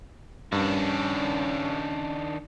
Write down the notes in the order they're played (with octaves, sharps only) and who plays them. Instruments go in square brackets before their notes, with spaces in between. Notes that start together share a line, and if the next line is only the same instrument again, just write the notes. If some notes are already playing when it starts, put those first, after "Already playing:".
[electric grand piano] G2 [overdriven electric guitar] D#3 D4 [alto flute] C#4